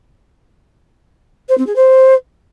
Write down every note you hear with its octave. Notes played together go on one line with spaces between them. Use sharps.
C5
C4
G#4
C5